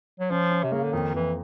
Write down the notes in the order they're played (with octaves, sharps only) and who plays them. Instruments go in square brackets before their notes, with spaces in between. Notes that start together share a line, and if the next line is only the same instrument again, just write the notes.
[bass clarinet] F#3
[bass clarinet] F3 [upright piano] C#4
[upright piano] C#4
[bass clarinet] C3
[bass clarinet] C#3 [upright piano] A#3
[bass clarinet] D3
[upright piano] F2 [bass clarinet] D#3
[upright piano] F2 [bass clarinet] E3